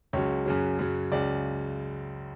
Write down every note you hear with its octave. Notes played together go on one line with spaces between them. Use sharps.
C#2 C#3 F#3 C#5
F#2 C#3 F#3
F#2 C#3 F#3
C#2 C#3 F#3 D5